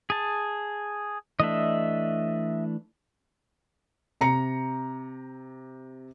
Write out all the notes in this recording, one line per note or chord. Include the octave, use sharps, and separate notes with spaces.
G#4 A5
E3 A3 D4 D#5 E5
C3 A#5 C#7